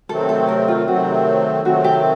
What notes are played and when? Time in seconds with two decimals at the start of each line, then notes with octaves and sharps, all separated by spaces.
0.09 C3 D#3 F#3 A3 C4 A4
0.29 A4
0.48 A#4
0.68 F4
0.87 C3 D#3 F#3 A3 C4 F#4
1.65 C3 D#3 F#3 A3 C4 F#4
1.84 G4